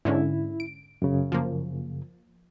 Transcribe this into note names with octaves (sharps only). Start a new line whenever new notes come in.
G#2 D3 C#4 E4
D7
F#2 C#3
F3 A#3